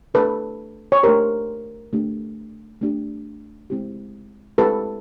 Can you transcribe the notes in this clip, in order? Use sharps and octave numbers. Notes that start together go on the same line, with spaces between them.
A3 D4 G4 A4 B4
C#5
A3 D4 G4 A#4 C5
A3 D4 G4
A3 D4 G4
G#3 C4 E4 G4
G#3 C4 E4 G4 A4 B4